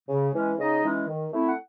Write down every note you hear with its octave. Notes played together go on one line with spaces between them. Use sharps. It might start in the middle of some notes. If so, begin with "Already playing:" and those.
C#3
E3 G#3 C#4
C#3 D#4 D#5
E3 G#3 C#4
D#3
A3 C4 E4
F#5